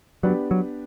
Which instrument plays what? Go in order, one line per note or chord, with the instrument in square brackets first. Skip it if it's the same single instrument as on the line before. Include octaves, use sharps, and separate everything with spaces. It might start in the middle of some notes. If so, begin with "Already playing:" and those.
[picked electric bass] F#3 [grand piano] B3 D4 G4 B4 D5
[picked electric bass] F#3